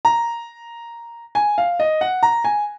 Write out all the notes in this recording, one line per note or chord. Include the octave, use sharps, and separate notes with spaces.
A#5
G#5
F5
D#5
F#5
A#5
G#5